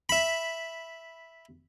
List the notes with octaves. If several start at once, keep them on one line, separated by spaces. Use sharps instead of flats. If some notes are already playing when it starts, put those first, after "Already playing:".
E5 B5